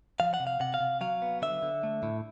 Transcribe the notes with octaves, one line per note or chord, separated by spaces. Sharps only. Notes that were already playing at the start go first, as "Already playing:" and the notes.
F3 F5
F#5
C3
F5
C3 F#5
F5
C3
F#3 F5
B3
D3 E5
D3
A3
A2